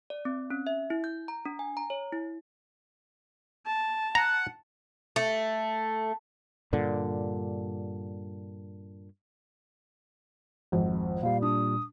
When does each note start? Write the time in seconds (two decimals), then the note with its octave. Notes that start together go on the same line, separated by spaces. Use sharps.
0.10 D5
0.25 C4
0.50 C#4
0.67 E5
0.90 E4
1.04 G6
1.28 A#5
1.45 D4
1.59 G#5
1.77 A#5
1.90 C#5
2.13 E4
3.66 A5
4.15 F#5 A#5
5.16 A3
6.73 G2 A#2 D3
10.72 G#1 F2
11.23 A#2 G3 F5
11.42 D4 D#6